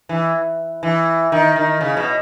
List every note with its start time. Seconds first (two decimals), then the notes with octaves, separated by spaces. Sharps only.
0.09 E3
0.83 E3
1.32 D#3
1.56 D#3
1.81 C#3
1.97 B2